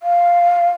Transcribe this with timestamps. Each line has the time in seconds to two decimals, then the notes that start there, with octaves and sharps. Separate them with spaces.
0.03 F5